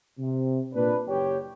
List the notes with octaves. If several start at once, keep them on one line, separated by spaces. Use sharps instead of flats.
C3
A#2 D4 B4
F#1 G4 C#5 G5